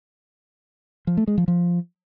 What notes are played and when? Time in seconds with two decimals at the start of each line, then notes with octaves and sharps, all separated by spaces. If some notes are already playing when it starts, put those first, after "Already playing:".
1.07 F3
1.17 A3
1.27 G#3
1.38 F3
1.48 F3